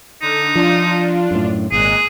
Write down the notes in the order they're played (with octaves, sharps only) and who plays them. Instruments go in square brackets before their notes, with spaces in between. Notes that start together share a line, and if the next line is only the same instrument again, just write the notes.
[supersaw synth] D3 [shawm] D#4
[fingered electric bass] F3 [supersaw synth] D4 F4
[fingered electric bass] F#2 A2
[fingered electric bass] G#1 [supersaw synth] A#2 G#3 F#6 [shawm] G#4